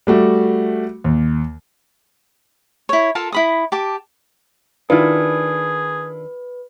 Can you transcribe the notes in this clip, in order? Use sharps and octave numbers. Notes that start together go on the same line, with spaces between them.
G3 A3 F#4
D#2
E4 C#5
F4 A4 A#4 A5
E4 B5 D#6
G4 A5 D6
D#3 D4 E4 F4 G#4 B4